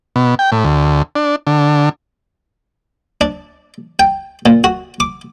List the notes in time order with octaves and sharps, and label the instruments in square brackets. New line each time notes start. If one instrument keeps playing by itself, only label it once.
[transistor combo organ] B2
G5
A2
D2
D4
D3
[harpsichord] D4
G5
A#2
F#4
D6